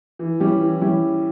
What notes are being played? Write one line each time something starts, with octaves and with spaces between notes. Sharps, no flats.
E3
G3 C#4 E4 G4
E3
G3 C#4 E4 G4